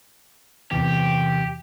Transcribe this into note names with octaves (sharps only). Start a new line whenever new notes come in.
E2 C3 E3 G4